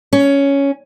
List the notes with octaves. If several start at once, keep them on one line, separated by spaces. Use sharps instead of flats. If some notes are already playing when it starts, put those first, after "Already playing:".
C#4